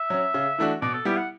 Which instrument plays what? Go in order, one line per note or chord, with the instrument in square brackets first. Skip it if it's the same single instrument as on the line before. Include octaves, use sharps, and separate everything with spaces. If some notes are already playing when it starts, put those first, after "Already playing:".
Already playing: [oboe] E5
[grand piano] F#3 C#4
C#3
E3 A3 D4 F#4
[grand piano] B2 [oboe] D5
[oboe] A4
[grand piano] G3 B3 E4 [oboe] G4
[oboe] F#5